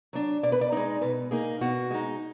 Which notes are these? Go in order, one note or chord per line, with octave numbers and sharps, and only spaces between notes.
F#3 D4
B2 D5
B4
D5
G#3 D#4 D5
B2 B4
A#3 D#4 G#4
B2 F#4
G#3 D#4